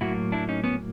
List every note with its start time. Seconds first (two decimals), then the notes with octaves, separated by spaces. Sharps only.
0.01 A2 F#3 A#3 E4 F#4
0.32 D4 E4
0.49 C#4 D#4
0.64 B3 C#4